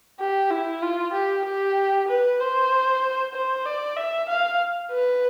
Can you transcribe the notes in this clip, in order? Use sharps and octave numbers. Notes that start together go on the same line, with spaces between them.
G4
E4
F4
G4
G4
B4
C5
C5
D5
E5
F5
B4